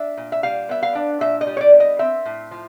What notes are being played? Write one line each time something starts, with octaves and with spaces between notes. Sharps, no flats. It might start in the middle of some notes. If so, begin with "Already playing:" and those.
Already playing: D4 E5
A#2
E5
G3 F5
B3 E5
F5
D4
A#2 E5
D#5
G3
C#5
D5
B3
D#5
C4 E5
A2
F3